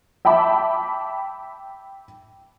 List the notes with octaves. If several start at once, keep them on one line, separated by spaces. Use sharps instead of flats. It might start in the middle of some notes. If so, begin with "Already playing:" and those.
E5 G5 A5 B5 D6